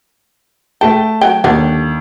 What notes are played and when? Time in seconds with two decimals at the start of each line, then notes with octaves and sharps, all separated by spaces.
0.81 A3 G5 A5
1.21 F#3 G5
1.44 D#2 D3 G3 D4